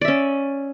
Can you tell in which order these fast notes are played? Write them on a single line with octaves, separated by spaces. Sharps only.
D5 E5 C#4